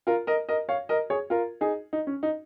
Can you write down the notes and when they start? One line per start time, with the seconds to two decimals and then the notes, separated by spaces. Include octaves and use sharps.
0.07 F4 A#4
0.27 A#4 D#5
0.49 A#4 D#5
0.69 C#5 F5
0.89 A#4 D#5
1.10 G#4 C#5
1.30 F4 A#4
1.61 D#4 G#4
1.93 D#4
2.07 C#4
2.23 D#4